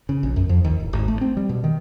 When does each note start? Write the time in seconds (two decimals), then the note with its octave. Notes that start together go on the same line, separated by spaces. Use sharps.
0.09 C#3
0.23 A#1
0.36 F#2
0.49 F2
0.64 D#2
0.80 D1
0.93 G#1
1.08 A3
1.21 C4
1.37 G3
1.49 B2
1.64 D#3